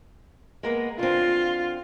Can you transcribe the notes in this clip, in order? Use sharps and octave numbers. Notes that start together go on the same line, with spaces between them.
G#3 A#3 B3
D3 C4 F4